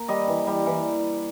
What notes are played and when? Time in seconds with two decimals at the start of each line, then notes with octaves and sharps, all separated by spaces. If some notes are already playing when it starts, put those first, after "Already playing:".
Already playing: A#3
0.08 G3 D#5
0.28 E3
0.47 G3
0.66 E3